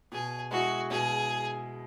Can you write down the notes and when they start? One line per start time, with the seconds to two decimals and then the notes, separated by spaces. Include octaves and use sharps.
0.12 B2 G#4
0.51 G#3 E4 F#4 G#4
0.91 B2 G#4